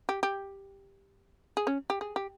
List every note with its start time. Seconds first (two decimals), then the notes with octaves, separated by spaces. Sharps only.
0.09 G4
0.23 G4
1.57 G#4
1.67 C#4
1.90 G4
2.01 G#4
2.16 G4